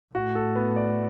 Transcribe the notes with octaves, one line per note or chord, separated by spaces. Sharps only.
A2 F#4
A4
B3
D5